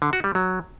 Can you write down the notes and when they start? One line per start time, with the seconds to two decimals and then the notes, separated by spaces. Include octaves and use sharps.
0.02 D3
0.13 F#4
0.24 G3
0.35 F#3